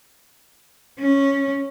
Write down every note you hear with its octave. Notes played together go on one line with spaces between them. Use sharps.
C#4